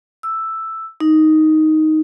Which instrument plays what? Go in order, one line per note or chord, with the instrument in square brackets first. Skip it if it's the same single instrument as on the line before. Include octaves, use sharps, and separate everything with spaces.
[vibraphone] E6
D#4